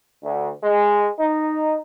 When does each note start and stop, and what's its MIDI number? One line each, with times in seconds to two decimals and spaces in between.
0.23 0.49 38
0.62 1.06 56
1.19 1.76 63